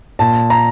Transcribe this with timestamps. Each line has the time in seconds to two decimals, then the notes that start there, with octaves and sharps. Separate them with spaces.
0.19 A#2 A5
0.50 A#5